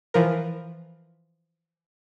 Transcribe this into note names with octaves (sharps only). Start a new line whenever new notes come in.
E3 F3 A#4